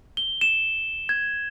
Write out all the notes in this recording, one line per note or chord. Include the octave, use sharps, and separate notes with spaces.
G7
E7
G#6